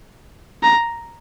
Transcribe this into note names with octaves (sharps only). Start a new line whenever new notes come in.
A#5